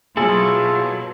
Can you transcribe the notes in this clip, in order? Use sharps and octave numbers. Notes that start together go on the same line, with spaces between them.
B2 F#3 E4 F4 G#4 A4